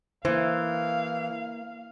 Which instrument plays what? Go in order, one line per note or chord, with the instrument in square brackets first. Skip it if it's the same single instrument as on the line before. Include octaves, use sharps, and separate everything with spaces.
[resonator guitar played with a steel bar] E3 [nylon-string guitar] A#3 C5 [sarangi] F5